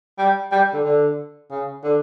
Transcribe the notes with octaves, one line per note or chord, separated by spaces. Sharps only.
G3
G3
D3
D3
C#3
D3